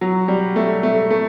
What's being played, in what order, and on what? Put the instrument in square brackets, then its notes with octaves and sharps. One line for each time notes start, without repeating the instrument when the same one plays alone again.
[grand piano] F#3
G3
A3
A3
A3